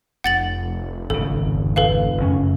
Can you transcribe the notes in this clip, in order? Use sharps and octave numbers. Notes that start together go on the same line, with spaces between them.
F1 F#5 A6 F#7
G#1 C#3 A4
A4 B4 F5
F#1 F#2 C#4